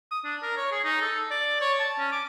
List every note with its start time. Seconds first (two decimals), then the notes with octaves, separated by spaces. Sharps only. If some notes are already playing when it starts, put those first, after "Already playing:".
0.11 D#6
0.24 D4
0.42 A#4
0.57 C#5
0.72 G#4
0.84 D#4
1.02 A4
1.31 D5
1.61 C#5
1.79 A5
1.99 C#4
2.12 D6